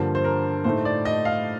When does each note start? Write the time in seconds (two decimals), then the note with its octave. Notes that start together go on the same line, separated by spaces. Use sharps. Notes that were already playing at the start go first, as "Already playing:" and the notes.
Already playing: G2 D3 F3 A#3 C5
0.15 C5
0.24 A#4
0.64 A2 A3 D#4 C5
0.85 D5
1.05 D#5
1.25 F5